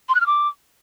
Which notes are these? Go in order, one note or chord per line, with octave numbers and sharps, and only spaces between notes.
C6
F#6
F6
D6